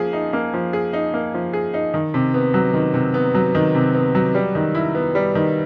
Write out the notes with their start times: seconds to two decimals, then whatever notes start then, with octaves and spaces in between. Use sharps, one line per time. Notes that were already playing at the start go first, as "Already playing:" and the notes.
Already playing: F3 A#3 G#4
0.13 D#4
0.33 A#3
0.54 F3
0.73 G#4
0.93 D#4
1.14 A#3
1.34 F3
1.53 G#4
1.74 D#4
1.94 D#3
2.14 C3
2.34 B3
2.54 F#3
2.74 D#3
2.94 C3
3.14 B3
3.35 F#3
3.55 D#3
3.75 C3
3.95 B3
4.15 F#3
4.35 G3
4.55 D#3
4.75 E4
4.95 B3
5.15 G3
5.35 D#3